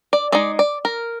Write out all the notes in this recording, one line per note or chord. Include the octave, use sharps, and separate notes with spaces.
D5
G#3 D#4 D5
D5
A#4